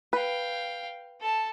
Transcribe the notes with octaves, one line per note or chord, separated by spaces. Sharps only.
B4 F5 G5
A4 A5